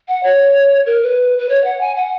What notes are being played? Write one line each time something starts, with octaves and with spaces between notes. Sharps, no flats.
F#5
C#5
A#4
B4
B4
C#5
F#5
G#5
F#5